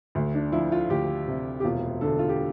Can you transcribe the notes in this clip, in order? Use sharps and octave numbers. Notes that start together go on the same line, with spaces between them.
D2
D4
F3 E4
F4
D2 G4
C3
G4
E1 F4
D3 A4
F4
G4